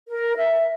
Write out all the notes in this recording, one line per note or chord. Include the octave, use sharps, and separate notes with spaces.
A#4
E5